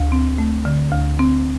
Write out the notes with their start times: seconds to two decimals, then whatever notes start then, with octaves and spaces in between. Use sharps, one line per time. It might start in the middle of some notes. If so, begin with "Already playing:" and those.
Already playing: D2
0.12 C4
0.38 A3
0.65 D3
0.92 D2
1.19 C4